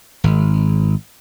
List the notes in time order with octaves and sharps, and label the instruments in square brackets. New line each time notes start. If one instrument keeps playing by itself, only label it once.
[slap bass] G#1